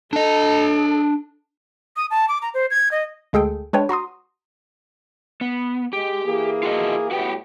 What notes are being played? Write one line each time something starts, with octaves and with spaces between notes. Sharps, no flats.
D4 A4 D#5
D#6
A5
D6
A#5
C5
G#6
D#5
D2 G#3 G#4 A4 G5
G#3 D4 B4 C#5 G5
F#4 A#5 C6 D#6
B3
G#3 G4
E3 A#3 G#4
F4 F#4 D#5
A2 G3 B3 F#4 G4 G5